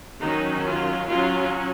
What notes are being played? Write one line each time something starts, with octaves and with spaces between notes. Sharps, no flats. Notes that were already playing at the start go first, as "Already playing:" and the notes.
D#3 F#3 C#4 D#4
F4
F#3 C#4 F4